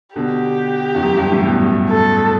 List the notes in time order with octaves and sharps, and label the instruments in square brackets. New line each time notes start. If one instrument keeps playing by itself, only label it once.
[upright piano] B2 D3 [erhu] G4
[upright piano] E2
F#2
E2 G2
F#2 A2
G2 B2
[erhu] A4